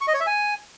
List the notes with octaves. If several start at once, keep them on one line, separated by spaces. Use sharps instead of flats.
C#6
D#5
C#5
E5
G#5